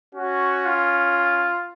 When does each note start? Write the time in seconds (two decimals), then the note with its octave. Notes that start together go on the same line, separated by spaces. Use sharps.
0.15 C#4 F#4
0.65 F4